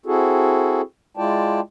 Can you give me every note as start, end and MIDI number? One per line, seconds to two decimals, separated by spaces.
0.06 0.82 60
0.06 0.82 64
0.06 0.82 66
0.06 0.82 68
0.06 0.82 69
1.17 1.60 56
1.17 1.60 64
1.17 1.60 65
1.17 1.60 74
1.17 1.60 79
1.17 1.60 81